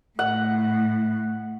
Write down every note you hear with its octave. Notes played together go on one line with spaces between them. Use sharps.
A2 F#5